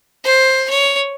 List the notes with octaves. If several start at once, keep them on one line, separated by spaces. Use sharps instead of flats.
C5
C#5